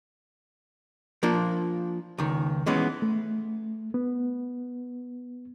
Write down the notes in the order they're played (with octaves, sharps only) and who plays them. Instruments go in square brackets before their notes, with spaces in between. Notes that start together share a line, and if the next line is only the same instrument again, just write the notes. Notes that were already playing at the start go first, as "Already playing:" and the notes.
[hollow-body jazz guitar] F3 A#3 D4 F4
C#2 D#3
E3 G#3 B3 C#4
[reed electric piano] A3
B3